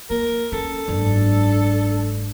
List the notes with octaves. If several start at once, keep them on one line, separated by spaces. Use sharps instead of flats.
A#3 A#4
C#4 A4
F#1 G#2 D4